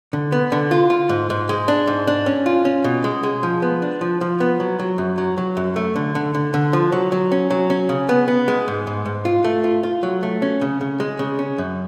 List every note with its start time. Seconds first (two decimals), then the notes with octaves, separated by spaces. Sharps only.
0.13 D3
0.32 B3
0.52 D3
0.71 F4
0.90 F4
1.09 G#2
1.30 G#2
1.49 G#3
1.68 D4
1.87 G#2
2.07 D4
2.26 C#4
2.46 F4
2.65 C#4
2.84 B2
3.04 G#3
3.23 G#3
3.43 F3
3.62 B3
3.82 D4
4.01 F3
4.21 F3
4.40 B3
4.60 F#3
4.79 F#3
4.98 F#2
5.18 F#3
5.38 F#3
5.57 F#2
5.76 A3
5.96 D3
6.15 D3
6.34 D3
6.54 D3
6.73 F3
6.92 F#3
7.12 F#3
7.32 C#4
7.50 F#3
7.70 C#4
7.89 C#3
8.09 B3
8.28 B3
8.48 G#3
8.68 G#2
8.87 G#2
9.06 G#2
9.25 F4
9.44 A3
9.64 F4
9.83 F4
10.03 F#3
10.23 A3
10.42 C#4
10.61 C#3
10.81 C#3
11.00 G#3
11.19 C#3
11.39 C#4
11.58 F#2